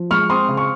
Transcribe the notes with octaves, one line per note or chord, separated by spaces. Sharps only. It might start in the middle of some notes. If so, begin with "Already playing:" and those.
Already playing: F3
G#3 C#6 F6
C4 C6 D#6
C#3
C#6